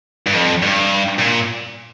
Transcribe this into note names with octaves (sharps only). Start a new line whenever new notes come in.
G2
F2
G2
A#2